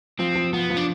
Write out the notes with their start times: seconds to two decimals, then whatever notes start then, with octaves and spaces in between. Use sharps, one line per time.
0.19 F3 C4
0.35 F3
0.53 F3 B3
0.70 F3
0.77 D4